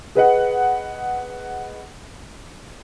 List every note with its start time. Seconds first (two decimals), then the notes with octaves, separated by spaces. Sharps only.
0.15 G#4 B4 D#5 F#5